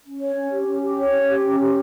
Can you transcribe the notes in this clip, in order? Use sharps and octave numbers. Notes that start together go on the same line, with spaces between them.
C#4
C#5
C#4
G4
C#4
G4
C#5
C#4
G4
C#4
G4